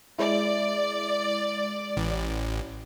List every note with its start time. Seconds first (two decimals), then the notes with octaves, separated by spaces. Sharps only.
0.19 G#3 E4 D5
1.97 A1